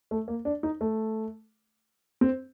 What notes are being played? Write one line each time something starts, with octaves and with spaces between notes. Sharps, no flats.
A3
A#3
D4
D#4
A3
C4